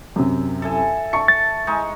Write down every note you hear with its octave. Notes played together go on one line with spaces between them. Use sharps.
F#2 C3
A4 E5 G#5
A5 C#6 C#7
A6
G#3 D#4 C#6